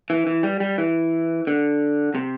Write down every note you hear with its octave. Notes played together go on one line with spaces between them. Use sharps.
E3
E3
G3
G3
E3
D3
C3